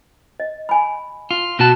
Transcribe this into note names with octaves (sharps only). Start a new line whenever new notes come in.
D#5
G#5 B5
F4
B2 F#4 A5